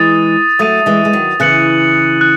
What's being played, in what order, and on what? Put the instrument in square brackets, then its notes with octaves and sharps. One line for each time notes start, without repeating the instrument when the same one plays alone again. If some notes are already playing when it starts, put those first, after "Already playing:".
Already playing: [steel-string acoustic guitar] E3 G#3 [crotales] D#6 A6 D#7
[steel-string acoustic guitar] F#3 A3 [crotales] D#6 A6 D#7
[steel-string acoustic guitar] E3 G#3
G#3
D#3 F#3
[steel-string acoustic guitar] C#3 E3 [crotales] F#6 C#7 F#7
[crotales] F#6